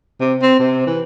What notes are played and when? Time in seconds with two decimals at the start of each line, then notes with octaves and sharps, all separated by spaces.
0.20 C3
0.42 C4
0.59 C3
0.87 E3